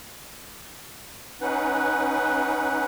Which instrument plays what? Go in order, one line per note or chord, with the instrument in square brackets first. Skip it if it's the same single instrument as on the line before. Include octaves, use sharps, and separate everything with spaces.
[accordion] C#4 D#4 B4 F#5